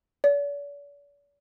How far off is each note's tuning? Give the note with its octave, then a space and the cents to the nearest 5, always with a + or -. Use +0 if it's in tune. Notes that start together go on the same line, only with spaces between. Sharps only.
D5 -45